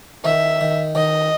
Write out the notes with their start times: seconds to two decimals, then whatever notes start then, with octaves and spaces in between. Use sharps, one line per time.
0.25 D#3 E5
0.61 D#3
0.95 D#3 D#5